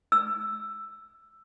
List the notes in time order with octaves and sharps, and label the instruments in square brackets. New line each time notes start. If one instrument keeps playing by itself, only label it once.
[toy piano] E6